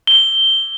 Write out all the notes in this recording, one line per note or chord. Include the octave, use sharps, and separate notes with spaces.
G7